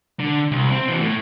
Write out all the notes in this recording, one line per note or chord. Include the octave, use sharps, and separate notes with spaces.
D3
C2
C4
B2 E3
A2